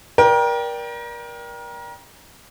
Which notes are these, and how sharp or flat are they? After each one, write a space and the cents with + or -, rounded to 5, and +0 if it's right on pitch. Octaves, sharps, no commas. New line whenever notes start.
A#4 +30 D5 +0 G5 +0